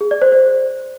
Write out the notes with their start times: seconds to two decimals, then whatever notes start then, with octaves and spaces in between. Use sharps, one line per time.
0.01 G#4
0.11 D5
0.22 C5
0.32 C5